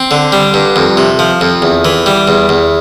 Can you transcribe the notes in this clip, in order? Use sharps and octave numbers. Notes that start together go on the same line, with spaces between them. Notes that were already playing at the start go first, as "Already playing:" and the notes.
Already playing: C4
D3
G3
G2
F2
C3
F3
F2
E2
E3
G3
E2
E2